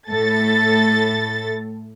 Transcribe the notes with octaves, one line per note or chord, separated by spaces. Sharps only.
A2 A4 A6